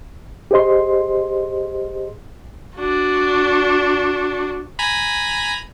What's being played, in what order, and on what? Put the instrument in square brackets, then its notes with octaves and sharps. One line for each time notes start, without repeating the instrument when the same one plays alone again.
[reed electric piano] G4 G#4 C5 D#5 C6
[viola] D4 F#4
[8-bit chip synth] G#5 A#5 B5